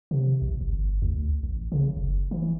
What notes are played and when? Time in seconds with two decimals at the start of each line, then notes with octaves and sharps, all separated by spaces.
0.11 C3
0.42 A1
0.61 G1
1.02 D2
1.43 A1
1.72 C#3
1.96 F#1
2.31 E3